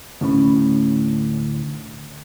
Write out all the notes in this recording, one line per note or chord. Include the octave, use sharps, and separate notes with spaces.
D2 A2 C#4 B5